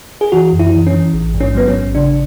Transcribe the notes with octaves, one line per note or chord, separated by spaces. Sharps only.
G#4
E3 F#4
F#2
E4
E3
C#4
E3
A1
G#2
C#4
F#3 B3
C#4
A1
C#3 D4